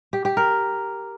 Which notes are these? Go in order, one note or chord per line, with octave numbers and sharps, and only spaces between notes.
G4
G4
A#4